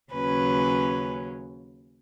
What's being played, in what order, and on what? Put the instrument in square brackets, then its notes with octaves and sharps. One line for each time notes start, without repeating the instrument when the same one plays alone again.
[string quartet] D#2 C#3 F#3 C#4 B4